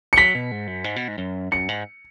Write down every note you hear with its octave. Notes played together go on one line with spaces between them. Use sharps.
C#7
F#3 B6
B2
G#2
F#2
G#2
B2
G#2
F#2
F#2 C#7
G#2